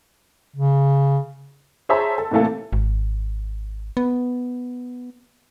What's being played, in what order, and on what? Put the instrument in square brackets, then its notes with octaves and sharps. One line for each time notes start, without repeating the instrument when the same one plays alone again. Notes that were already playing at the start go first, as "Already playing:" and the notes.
[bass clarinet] C#3
[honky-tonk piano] G#4 C5 C#5 E5 A5 A#5
A4
A2 C3 E3 A3 A#3 A4
[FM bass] G#1
B3